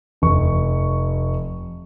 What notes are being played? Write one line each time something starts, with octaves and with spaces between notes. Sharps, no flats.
F1 C#6